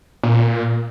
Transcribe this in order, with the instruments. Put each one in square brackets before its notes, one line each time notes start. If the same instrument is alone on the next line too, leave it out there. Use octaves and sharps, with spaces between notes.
[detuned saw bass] A#2